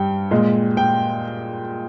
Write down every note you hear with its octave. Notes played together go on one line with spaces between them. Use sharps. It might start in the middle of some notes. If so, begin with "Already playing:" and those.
Already playing: G2 G3 G5
A#2 G#3
G5